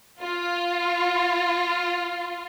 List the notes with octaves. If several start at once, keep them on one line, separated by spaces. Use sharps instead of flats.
F4